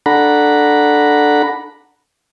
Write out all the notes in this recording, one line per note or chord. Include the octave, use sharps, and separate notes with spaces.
D4 A4 F#5 A#5 B5